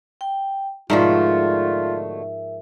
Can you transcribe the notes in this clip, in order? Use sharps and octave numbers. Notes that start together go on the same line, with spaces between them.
G5
G#2 B2 D3 F3 A3 F4 A#4 E5